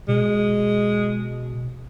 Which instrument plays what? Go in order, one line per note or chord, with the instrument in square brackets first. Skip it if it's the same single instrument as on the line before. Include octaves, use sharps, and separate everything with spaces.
[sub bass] B2 [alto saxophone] G#3